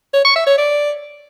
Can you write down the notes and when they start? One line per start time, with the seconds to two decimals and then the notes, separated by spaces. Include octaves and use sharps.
0.14 C#5
0.25 C#6
0.36 E5
0.47 C#5
0.58 D5